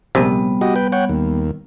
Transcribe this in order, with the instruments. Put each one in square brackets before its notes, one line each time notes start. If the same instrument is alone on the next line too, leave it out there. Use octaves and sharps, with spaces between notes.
[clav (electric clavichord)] A#1 C3 [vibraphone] G3 B3
[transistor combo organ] F#4 G4 D#5
B4 G5
C#5 F#5 G5
D#2